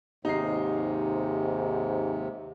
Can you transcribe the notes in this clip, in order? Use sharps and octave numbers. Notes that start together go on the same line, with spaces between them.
D#2 G#2 C3 D#4 C7